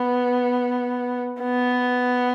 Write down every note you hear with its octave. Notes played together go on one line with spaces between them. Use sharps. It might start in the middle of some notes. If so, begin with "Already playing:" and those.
Already playing: B3
B3